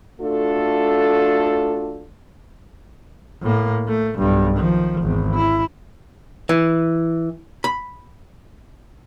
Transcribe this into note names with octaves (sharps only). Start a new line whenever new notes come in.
A3 D4 F4 F#4 A4
A2 A#3
A3
B1 G2
D#3 F3
G#1 E2
E4
E3
B5